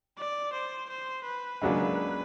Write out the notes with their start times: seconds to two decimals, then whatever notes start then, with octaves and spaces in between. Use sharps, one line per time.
0.18 D5
0.53 C5
0.90 C5
1.25 B4
1.62 C#2 C#3 F#3 A#3 D4